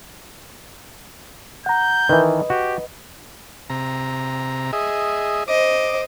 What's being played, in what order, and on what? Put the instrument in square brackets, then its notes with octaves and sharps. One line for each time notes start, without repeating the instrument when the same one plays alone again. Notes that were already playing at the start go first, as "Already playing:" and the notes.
[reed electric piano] F#5 A#5 [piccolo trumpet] G6
[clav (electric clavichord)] D#3 E3 [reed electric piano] B4 D#5
[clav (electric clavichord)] F#4 [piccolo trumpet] G4
[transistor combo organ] C3 A#5
G#4 D#5 E5
[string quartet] C5 D#5 [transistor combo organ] D6